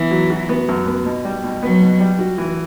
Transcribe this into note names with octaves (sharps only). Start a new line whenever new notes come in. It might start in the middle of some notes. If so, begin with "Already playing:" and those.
Already playing: E3 B3
F#3
F#4
B3
F#2
B3
B2
G3
B2
F#3 B3
B2
G3
F#4
E3